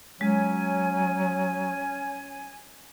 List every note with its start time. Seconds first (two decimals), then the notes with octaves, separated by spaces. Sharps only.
0.21 F#3 G#3 C#4 G#5